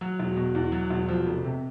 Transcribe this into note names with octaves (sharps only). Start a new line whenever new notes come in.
F#3
E1
B2
E2
F#3
E1
F3
F1
C3